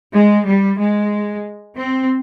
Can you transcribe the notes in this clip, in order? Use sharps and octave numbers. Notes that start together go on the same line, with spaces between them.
G#3
G3
G#3
C4